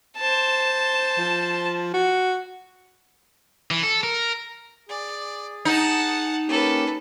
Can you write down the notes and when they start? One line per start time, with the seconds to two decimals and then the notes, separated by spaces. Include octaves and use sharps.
0.18 C5 A5
1.19 F3
1.94 F#4
3.71 E3
3.83 A4
4.04 A#4
4.89 G#4 D5
5.65 D#4 F#5 A5
6.48 A#3 C#4 G4 A4 B4